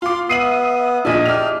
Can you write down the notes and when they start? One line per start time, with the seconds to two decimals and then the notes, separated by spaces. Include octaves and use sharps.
0.02 F4 C6 D6
0.29 B3 E5 D#6 C7 D#7 F#7
1.05 A#1 D4 E4 G#4 D#5
1.26 G4 D5 F6 F7